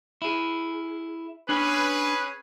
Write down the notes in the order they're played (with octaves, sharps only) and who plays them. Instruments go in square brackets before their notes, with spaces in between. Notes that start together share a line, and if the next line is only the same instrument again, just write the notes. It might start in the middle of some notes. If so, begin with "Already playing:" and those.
[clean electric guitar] E4 G#4
[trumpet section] C#4 G#4 B4 [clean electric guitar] D4 C#5 G#5